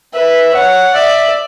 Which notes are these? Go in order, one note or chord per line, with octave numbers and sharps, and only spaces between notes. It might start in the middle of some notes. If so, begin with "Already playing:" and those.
B4 E5
C#5 F#5
D5 E5